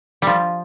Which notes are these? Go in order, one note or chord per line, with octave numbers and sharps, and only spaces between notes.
F3 G3